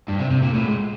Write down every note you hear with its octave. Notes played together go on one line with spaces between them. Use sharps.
G2
C3
C3
A#2
A2
G#2